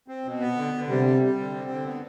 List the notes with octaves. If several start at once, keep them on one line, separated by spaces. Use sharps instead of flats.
C4
B2
B3
D3
D3
C3 G3
G3
G3
D3
C4
D3
B3